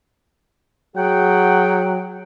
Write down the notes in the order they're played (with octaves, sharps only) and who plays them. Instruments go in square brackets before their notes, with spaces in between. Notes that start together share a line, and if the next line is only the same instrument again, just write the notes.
[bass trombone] F#3 [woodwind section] G#4 F#5 G5